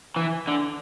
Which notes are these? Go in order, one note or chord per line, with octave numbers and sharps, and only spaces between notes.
E3
D3